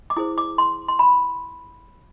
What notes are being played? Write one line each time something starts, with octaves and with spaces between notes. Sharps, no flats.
D6
E4 G#4 C5 D#6
D6
C6
C6
B5